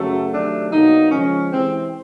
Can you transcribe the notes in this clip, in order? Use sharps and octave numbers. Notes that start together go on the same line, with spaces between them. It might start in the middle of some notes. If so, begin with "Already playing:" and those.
Already playing: F#2 C#3 F#3 A3
C3 D#3 F#3 A3 D4
B2 F#3 A#3 D#4
C#3 F3 G#3 C#4
C3 E3 G#3 C4